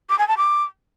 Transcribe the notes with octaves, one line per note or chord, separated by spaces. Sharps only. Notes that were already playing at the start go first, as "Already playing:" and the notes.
D6
G#5
A5
D6